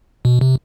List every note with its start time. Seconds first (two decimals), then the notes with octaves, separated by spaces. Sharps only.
0.25 B2
0.41 C3